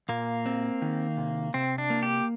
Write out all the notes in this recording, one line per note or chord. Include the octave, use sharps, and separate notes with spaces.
A#2 A#3
C4
D#3
C3
C3 C4
D4
A#3
G4